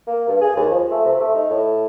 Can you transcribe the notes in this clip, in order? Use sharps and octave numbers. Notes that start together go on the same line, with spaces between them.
A#3
G2
G#4
D#2
F3
A3
C3
A3
D#4
A2